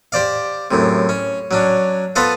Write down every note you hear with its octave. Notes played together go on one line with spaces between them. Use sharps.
G4 C5 D5 F5
F#2 A2 C3
C#4
F#3 C#4 D4
B3 F4 A4 B4 C5 F5